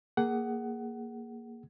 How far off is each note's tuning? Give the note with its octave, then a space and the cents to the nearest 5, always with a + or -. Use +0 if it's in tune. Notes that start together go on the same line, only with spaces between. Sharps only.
A#3 +0 G#4 +0 F#5 +20